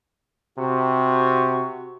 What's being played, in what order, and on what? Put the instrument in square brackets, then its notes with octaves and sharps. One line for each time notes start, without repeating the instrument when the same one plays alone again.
[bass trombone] C3 [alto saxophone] F#4